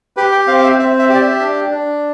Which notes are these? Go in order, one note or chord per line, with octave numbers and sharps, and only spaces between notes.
G4 B4
G5
C4 F5
F5
E5
C4 E5
E5
G4
D5
E5
D4
D4